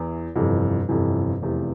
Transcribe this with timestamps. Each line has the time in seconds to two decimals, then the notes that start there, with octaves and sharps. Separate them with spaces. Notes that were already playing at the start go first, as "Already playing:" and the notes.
Already playing: E2 E3
0.35 G1 F2 C3 E3
0.89 G1 F2 C3 E3
1.42 F1 E2 C3